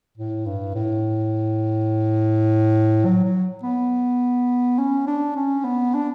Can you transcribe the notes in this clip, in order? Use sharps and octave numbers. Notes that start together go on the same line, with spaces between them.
A2
G2
A2
F#3
F#3
B3
C#4
D4
C#4
B3
D4